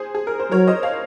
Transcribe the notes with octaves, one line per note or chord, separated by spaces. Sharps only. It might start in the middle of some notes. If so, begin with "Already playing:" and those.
Already playing: G#4 C5
G#4
A#4
C5
F#3 A#4 C#5
C5 D#5
C#5 F5